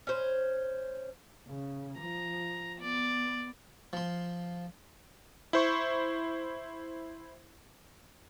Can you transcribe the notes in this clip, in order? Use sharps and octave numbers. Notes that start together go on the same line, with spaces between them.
C#4 C5
C#3
F3 A#5
B3 D5
F3 C6
E4 C5 C#6